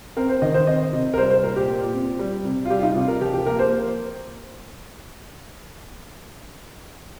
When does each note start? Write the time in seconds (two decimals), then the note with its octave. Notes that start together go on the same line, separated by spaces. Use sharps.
0.17 C4 A#4
0.29 C5
0.42 D#3 D#5
0.54 C5
0.67 C3 D#5
0.93 C3
1.13 A#4
1.17 G3 C5
1.30 C5
1.43 A#2 A#4
1.56 G4
1.68 A#2
1.94 C4
2.19 G3
2.45 C3
2.65 F4
2.70 G3 G4
2.79 F4
2.83 D#4
2.96 C3 F4
3.08 A#4
3.21 F3 G4
3.34 G4
3.46 A#3 A#4
3.59 C5